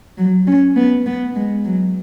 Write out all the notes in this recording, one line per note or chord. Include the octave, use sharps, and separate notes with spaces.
F#3
C#4
B3
B3
G#3
F#3